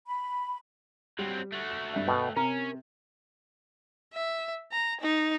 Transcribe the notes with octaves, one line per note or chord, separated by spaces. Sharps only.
B5
F#3 G3 C4
A3 F#4
E7
G2 E5
B2 G5 A5
C3 C#4 A#4
E5
A#5
D#4